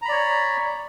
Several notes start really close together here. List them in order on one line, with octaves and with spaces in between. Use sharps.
A#5 B5 D5 C#5